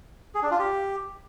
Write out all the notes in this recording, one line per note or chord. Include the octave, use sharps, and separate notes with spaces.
G#4
D4
F4
G4